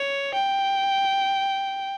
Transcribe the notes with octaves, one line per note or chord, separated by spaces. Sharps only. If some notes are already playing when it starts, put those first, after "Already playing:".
Already playing: C#5
G5